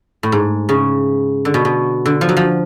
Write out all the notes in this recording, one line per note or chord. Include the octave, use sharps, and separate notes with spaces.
A2
G#2
C#3
D3
B2
B2
D3
F3
F#3
F3